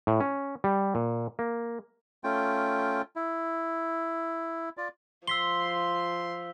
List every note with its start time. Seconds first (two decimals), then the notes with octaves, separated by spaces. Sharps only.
0.07 A2
0.20 C#4
0.64 G3
0.95 A#2
1.39 A#3
2.24 A3 C#4 F4 G5
3.16 E4
4.77 F4 D5
5.27 F3 C6 E6 B6 G7